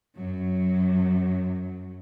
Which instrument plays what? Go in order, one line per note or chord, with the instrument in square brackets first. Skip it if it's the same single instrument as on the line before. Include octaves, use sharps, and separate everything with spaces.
[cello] F#2 F#3